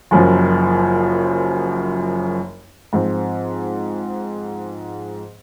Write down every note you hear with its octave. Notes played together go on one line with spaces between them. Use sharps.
F#1 F#2 F3
G#2 F3 C4